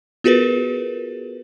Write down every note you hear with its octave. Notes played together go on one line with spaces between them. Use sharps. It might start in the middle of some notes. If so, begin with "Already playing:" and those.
B3 F4 F#4 G#4 A#4 B4